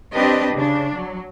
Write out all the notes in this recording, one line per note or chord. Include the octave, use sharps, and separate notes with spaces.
C4 D4 G4 B4 D#5
C#3 D4
F#3